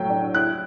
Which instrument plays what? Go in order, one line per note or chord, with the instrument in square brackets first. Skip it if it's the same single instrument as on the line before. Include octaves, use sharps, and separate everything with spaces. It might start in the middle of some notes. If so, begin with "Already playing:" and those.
Already playing: [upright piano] A2 F#3 A3 G5
D4
E4 F#6